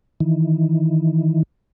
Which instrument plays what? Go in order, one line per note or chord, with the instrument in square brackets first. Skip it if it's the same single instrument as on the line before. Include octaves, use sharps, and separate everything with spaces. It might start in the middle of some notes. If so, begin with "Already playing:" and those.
[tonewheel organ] D#3 E3